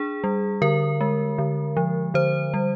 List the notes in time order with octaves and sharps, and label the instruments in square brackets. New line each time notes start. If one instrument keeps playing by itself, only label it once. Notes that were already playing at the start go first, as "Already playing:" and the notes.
Already playing: [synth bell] D4 G#4
G3
D3 A#4
G#3
D3
F3
D3 C5
G3